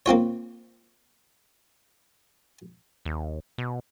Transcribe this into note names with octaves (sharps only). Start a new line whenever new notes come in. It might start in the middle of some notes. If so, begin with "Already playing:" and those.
A#3 C4 F4 C#5
D#2
B2